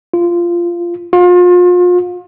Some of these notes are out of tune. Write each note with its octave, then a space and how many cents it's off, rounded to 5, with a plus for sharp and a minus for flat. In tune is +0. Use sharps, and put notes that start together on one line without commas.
F4 -15
F4 +35